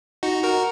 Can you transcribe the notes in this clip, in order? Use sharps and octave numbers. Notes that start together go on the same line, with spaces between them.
D#4 F#4
F#4 A#4